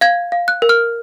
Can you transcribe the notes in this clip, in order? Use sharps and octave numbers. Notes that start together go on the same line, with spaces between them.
F5 G#6
F5
F#6
A#4
F6